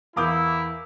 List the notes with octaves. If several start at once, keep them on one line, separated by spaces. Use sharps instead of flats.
E2 E4 A#4 F5 D6 D#6 G6